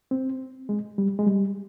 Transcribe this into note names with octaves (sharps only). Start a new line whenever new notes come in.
C4
G#3
G3
G#3
G3